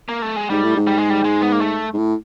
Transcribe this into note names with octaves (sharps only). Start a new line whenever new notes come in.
A#3
A3
G#3
G#2 G3
A2
G#2
G3
G#3
G3
G#3
B3
A#3
A3
G#2
A2